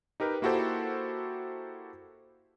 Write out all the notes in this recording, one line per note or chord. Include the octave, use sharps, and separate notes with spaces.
D#4 G4 A#4 B4
A#3 E4 F#4 G4 A4 C5